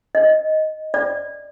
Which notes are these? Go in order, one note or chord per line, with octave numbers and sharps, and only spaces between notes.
D#5
D5